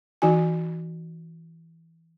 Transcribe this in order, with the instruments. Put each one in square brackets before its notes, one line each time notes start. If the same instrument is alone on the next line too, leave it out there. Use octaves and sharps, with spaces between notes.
[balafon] E3 D#4 F#4 G#5